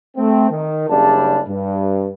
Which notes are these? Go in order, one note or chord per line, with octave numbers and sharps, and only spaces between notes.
A3 C4
D#3
F#1 C#3 G3 D4 A5
G2